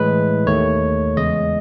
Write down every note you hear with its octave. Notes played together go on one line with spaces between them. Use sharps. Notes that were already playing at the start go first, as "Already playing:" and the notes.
Already playing: A2 E3 G#3 B4
D#2 D#3 A3 C#5
E2 C#3 G#3 D#5